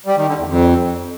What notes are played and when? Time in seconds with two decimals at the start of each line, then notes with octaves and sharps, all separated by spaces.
0.06 G3
0.17 D#3
0.27 D3
0.38 E2
0.48 F2